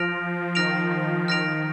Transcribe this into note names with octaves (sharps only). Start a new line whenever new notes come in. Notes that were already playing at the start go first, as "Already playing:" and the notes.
Already playing: F3 F6 A#6 D7 F7
D#3 F6 A#6 D7 F7
D#3 F6 A#6 D7 F7